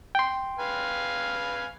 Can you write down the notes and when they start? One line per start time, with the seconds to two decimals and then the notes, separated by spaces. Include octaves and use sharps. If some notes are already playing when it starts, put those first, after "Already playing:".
0.15 G5 C6
0.59 B4 F5 G#5